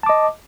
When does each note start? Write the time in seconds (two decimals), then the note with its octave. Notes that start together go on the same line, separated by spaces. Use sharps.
0.03 A5
0.06 D6
0.09 D#5